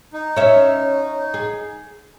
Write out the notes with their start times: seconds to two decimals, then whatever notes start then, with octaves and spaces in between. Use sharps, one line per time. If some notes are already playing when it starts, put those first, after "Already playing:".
0.13 D#4
0.37 C#4 E5
1.34 G#4